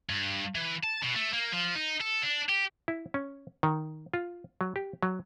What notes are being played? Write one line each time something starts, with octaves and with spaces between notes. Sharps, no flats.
G2
E3
A5
B2
A3
A#3
F3
D#4
A4
D4
G4
E4
C#4
D#3
F4
F#3
G4
F#3